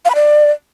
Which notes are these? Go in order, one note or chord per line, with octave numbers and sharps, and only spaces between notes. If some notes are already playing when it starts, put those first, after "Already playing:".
F5
B5
D5